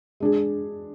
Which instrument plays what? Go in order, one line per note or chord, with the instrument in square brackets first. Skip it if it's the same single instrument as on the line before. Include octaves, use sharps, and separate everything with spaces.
[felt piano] G#3 D4 G#4